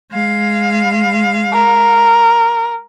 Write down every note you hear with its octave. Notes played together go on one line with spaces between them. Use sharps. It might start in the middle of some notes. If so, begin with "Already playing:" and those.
G#3 F5
A#4